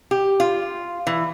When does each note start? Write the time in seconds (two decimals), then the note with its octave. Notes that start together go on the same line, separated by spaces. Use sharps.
0.11 G4
0.40 F4
1.07 E3